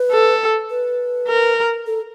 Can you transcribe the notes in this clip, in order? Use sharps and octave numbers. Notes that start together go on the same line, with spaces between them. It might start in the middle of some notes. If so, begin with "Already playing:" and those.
Already playing: B4
A4
B4
A#4
A4